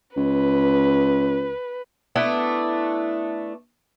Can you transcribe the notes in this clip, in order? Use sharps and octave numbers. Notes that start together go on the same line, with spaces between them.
C#2 B4
A3 B3 D4 E4